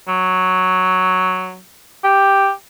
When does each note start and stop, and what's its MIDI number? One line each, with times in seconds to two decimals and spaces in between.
0.08 1.59 54
2.04 2.50 67